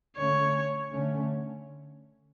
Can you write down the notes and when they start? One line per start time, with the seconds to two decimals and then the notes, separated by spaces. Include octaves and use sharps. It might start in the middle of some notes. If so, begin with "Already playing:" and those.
0.17 D3 A3 C#4 C#5
0.93 D3 A3 C#4